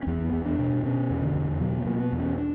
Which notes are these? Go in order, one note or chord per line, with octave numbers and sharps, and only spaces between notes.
C#4
E2 B3
E2
D4
B2
B2 C#4
E2
D3
E2
B2 F#3
A#3
B2
B3
E2
C#4
D4